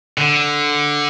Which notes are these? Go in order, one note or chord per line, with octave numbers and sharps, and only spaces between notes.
D3